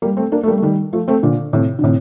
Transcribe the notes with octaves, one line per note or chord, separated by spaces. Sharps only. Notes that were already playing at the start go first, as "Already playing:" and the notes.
G3 A#3
A3 C4
A#3 D4
A3
G3 A#3
A3
D#3 G3
F3 A3
A3 C4
A#2 D3
A2 C3
D3
A2 C3